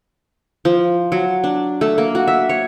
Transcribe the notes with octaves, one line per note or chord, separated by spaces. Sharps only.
F3
F#3
D4
A3
A#3
F#4
E5
C#5